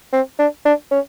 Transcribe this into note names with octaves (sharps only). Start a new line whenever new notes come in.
C4
D4
D4
C#4